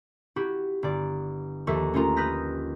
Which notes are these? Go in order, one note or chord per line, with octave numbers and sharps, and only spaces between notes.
E4 F#4 G4
G1 D5
D#2 F3 A4 E5 C#6
A3 C#4 D#4 F4 A#4
B4 D#6 F6 G6 A#6 B6